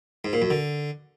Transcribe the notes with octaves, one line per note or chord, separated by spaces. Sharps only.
G#2
A#2
F#2
D3